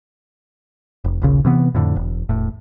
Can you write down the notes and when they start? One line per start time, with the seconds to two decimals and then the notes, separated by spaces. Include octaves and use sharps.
1.04 F1
1.22 D#1 A#1 C#3
1.45 C3 E3 B3
1.75 F2 A2 D3
1.96 E1
2.29 E1 A2